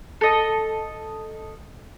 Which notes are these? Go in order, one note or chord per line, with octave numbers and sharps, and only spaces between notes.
A4 D#5